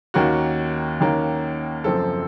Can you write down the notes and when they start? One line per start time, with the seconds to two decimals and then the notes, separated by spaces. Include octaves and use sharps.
0.14 D#2 D#3 A#3 C#4 F#4
1.00 D#2 D#3 A#3 C#4
1.84 F#1 F#2 F3 C4 A4